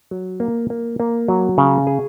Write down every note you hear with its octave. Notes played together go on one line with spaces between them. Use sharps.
F#3
A#3
A#3
A#3
F#3
C#3
G#4